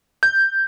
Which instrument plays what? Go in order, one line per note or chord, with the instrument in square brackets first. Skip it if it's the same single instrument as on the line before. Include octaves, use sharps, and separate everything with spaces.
[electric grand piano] G6